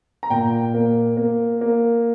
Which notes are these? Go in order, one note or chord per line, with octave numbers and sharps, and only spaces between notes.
A#5
A#2 G5
A#3
A#3
A#3